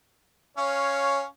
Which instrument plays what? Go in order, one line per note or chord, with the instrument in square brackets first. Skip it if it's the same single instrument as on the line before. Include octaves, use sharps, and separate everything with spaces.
[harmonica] C#4 F5 [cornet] C#5